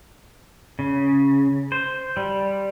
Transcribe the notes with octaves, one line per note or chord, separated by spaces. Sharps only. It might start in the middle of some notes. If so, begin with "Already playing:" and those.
C#3
C5
G3